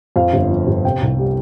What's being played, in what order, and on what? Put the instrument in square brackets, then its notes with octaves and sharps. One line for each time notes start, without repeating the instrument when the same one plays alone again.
[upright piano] F2 F5
G1
F3
G1
C3 G5
C2
G3